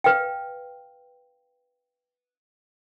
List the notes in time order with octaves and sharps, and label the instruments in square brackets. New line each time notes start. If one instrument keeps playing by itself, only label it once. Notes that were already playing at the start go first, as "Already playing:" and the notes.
[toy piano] B4 F5 G5